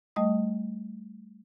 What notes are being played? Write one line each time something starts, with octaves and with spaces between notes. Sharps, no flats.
G3 A3 D#5 D#6